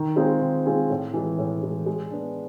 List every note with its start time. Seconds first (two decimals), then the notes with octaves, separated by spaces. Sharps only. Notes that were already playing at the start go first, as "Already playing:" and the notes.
Already playing: D#3
0.16 G#3 C4 F4 G#4
0.41 D#3
0.66 G#3 C4 F4 G#4
0.90 A2
1.14 E3 G#3
1.38 A2
1.63 E3 G#3
1.86 G#3
2.11 B3 D4